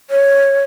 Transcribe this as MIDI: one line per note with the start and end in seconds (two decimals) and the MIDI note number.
0.10 0.63 73